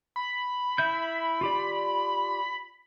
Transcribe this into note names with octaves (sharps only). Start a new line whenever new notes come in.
B5
E4 E5 G6
F4 G4 D5